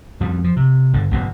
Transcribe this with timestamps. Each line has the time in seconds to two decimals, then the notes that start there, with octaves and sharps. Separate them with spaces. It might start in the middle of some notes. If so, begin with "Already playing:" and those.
0.20 F2 F3 G3
0.44 F3
0.57 C3
0.93 G1 D3
1.11 G1 F#2 B2